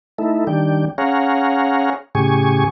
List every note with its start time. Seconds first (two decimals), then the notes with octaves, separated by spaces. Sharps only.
0.18 A3 D#4 E4 A4
0.47 D#3 G3 D4 G5
0.98 C#4 G#4 C#5 F5 F#5 A#5
2.15 A2 C#3 G4 G#4 G#5 C#6